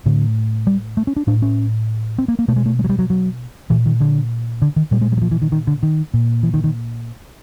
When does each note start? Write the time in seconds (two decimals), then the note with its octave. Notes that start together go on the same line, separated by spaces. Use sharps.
0.06 A2 D3
0.67 G3
0.97 A3
1.07 C#4
1.16 D4
1.27 A2 D4
1.42 C#4
2.18 C4
2.28 A#3
2.39 A#3
2.48 B2 A3
2.56 G#3
2.66 A3
2.79 G#3
2.84 F#3
2.89 G3
2.99 F#3
3.10 F#3
3.70 A#2 E3
3.86 D#3
4.00 D3
4.62 D3
4.76 D#3
4.91 A#2 G3
5.01 G#3
5.12 G3
5.17 F#3
5.22 F3
5.31 E3
5.42 D#3
5.52 D#3
5.67 D3
5.83 D#3
6.14 A#2
6.43 E3
6.54 D#3
6.64 D#3